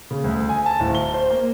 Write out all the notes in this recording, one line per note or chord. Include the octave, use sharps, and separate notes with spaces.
C#3
D2
G#5
A5
D1
G7
C5
A#3